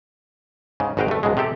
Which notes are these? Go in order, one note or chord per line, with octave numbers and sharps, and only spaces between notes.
G#2 C#3
G#1 G#2 F#4 B4 F5 G5
G2 A3
C#2 G#2 B2 G#3
C3 C4 G4 A4